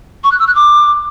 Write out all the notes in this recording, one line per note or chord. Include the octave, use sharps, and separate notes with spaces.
C#6
F#6
E6
F#6
D6